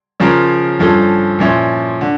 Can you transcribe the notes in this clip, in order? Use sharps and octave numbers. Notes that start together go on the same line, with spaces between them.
C#3 F3 C#4 F4 A#4
G2 F3 C#4 F4 A4
A#2 F3 C#4 E4
D3